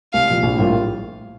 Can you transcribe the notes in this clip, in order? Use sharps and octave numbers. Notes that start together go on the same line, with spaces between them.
C2 F5
A#2 F3
A#1
A2 G3 A#3 F4